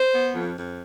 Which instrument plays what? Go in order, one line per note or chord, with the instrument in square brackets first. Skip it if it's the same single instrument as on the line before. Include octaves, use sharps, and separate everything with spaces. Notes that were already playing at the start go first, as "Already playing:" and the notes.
Already playing: [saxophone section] C5
B3
F2
F2